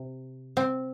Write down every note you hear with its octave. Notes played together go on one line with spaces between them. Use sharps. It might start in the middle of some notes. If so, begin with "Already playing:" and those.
Already playing: C3
C4